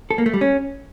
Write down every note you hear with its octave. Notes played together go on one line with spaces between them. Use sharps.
A4
A#3
A3
G3
C#4